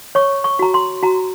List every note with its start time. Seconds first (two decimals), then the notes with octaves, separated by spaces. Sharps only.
0.15 C#5 C#6
0.44 C#6
0.59 F#4 A#5
0.74 C6
1.03 F#4 A#5